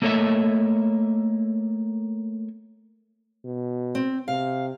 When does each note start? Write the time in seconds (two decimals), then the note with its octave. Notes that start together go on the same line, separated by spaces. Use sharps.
0.02 A3 A#3 A4 C#5 D#5 E5
3.44 B2
3.95 C4
4.28 C3 F5